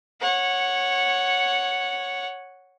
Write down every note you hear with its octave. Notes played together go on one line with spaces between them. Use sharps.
C#5 F#5